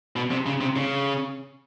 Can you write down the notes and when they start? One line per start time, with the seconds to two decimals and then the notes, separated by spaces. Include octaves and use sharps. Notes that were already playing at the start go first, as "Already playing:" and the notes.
0.16 B2
0.31 C3
0.46 C#3
0.61 C3
0.76 C#3